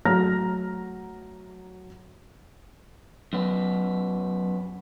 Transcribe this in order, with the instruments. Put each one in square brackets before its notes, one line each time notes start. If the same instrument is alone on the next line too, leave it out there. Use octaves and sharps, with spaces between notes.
[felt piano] F#3 A3 A#5 F6 A#6
[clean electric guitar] F#2 B3